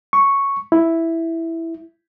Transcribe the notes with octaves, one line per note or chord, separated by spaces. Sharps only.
C#6
E4